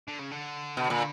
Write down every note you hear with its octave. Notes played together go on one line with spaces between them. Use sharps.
D3
C#3
D3
B2
A#2